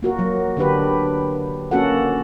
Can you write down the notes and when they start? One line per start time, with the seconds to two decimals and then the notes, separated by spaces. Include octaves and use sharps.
0.03 A#3 F#4 A#4
0.19 F#3
0.57 D3 D4 G4 B4
1.71 A#3 C#4 F#4 A4 F#5